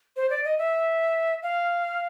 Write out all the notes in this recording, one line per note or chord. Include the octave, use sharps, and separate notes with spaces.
C5
D5
D#5
E5
F5